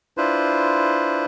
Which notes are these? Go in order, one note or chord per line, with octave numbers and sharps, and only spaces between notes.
D4 E4 F4 B4 C5